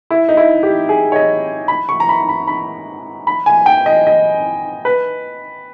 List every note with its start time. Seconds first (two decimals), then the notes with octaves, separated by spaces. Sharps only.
0.11 E4
0.29 D#4
0.37 E4
0.63 G4
0.89 G#4
1.12 C#5
1.16 D#5
1.68 B5
1.89 C#6
2.00 A#5
2.09 B5
2.29 B5
2.47 B5
3.27 B5
3.46 G#5
3.66 G5
3.86 D#5
4.07 D#5
4.85 B4